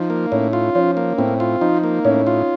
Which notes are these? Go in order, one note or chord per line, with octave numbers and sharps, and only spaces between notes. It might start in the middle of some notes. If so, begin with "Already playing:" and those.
Already playing: F3 D#4
A#3
A2 C#4
F4
F3 C#4
A#3
A2 C4
F4
F3 D#4
A#3
A2 C#4
F4